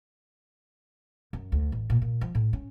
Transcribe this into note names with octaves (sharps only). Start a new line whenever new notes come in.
F#2
D2
A1
A#2
A#2
F3
A2
C#4